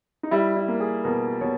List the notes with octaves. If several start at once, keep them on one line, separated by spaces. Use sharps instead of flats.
D#4
G3 E4
E4
A#3
G#4
B2 A#4
B2 C#5